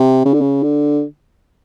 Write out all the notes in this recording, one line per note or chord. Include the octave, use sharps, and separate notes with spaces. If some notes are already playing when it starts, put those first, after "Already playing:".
Already playing: C3
C#3
D3
C#3
D3